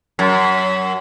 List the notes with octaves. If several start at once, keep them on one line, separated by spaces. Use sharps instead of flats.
F#2